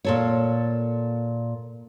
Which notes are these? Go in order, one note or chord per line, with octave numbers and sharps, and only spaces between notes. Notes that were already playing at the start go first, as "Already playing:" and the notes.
A#2 A4 C#5